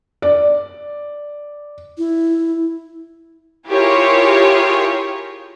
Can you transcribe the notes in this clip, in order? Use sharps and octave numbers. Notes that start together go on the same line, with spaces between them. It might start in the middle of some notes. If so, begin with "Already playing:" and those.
D5
E4
E4 F4 G4 G#4 A#4 C#5